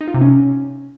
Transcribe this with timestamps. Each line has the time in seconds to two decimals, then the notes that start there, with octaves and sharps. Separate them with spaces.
0.01 D#4
0.07 F4
0.14 C3
0.21 C#4